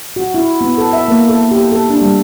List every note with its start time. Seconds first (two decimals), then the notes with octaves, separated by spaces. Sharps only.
0.16 F#4
0.34 E4
0.61 B3
0.78 A4
0.93 E5
1.08 A#3
1.29 A4
1.51 G4
1.72 A4
1.90 D4
2.02 G3